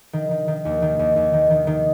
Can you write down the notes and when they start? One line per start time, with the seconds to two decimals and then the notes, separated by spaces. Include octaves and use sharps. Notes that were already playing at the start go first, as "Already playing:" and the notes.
0.13 D#3
0.31 D#3
0.48 D#3
0.65 D#2
0.82 D#3
0.99 D#2
1.16 D#2
1.33 D#3
1.50 D#3
1.67 D#3